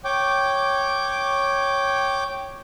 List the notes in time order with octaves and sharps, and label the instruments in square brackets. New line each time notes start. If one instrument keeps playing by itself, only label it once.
[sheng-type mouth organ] C#5 G5 D6